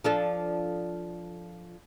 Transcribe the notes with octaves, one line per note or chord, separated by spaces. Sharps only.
F3 D4 A4